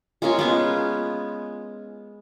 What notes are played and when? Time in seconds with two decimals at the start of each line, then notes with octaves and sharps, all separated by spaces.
0.22 G#3 A#3 C#4 F4
0.39 G#3 B3 B4